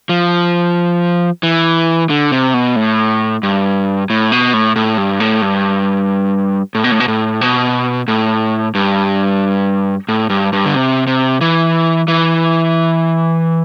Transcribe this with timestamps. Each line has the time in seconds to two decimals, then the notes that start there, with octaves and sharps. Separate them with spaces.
0.09 F3
1.43 E3
2.10 D3
2.32 C3
2.54 B2
2.76 A2
3.43 G2
4.10 A2
4.32 B2
4.54 A2
4.76 A2
4.98 G2
5.20 A2
5.42 G2
6.75 A2
6.84 B2
6.91 A2
7.00 B2
7.08 A2
7.41 B2
8.08 A2
8.75 G2
10.09 A2
10.30 G2
10.53 G2
10.66 D3
10.75 C3
11.07 C3
11.41 E3
12.08 E3